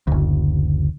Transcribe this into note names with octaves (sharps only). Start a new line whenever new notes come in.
F#1 D2